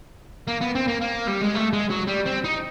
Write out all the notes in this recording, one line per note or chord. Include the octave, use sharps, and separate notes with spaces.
A#3
B3
C4
A#3
A#3
G3
G#3
A3
G#3
F#3
G3
C4
D#4